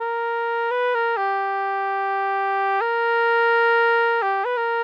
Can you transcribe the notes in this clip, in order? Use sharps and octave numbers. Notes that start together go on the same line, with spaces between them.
A#4
B4
A#4
G4
A#4
G4
B4
A#4